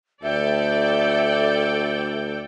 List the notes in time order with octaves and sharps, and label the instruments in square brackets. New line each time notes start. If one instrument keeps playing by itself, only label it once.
[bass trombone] D2 [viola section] A4 D5 G5 [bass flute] E5